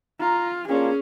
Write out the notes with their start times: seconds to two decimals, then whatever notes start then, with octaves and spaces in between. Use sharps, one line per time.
0.20 F4 A#5
0.69 A#3 C#4 D4 F4 G#4